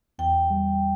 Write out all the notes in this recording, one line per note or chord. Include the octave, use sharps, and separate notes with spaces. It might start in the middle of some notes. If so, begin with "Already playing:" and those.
E2 G5
G3